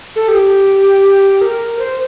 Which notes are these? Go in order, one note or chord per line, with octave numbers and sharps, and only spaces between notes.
A4
G4
A#4
C5